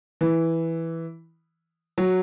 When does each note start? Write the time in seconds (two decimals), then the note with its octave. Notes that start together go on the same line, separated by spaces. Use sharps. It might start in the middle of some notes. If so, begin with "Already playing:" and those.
0.21 E3
1.98 F#3